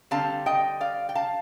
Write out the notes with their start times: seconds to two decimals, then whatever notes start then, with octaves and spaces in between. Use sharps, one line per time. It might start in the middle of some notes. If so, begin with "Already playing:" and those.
0.11 D3 G3 C4 F5 A5
0.46 D#5 G5
0.81 D5 F5
1.09 G5
1.15 F5 A5